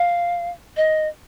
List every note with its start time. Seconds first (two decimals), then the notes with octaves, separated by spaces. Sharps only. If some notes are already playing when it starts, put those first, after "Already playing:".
Already playing: F5
0.77 D#5